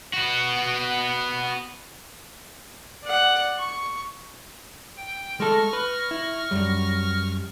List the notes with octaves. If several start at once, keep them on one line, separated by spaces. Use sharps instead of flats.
B3 F#4
D5 F#5
C#6
G5
G#3 A4 C#6 F6 A#6
B4
E4
F#2 G3